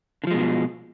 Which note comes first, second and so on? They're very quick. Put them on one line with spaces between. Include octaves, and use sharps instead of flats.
D3 F3 G#3 B2